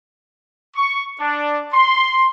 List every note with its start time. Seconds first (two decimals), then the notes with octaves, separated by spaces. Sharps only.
0.76 C#6
1.19 D4
1.73 C6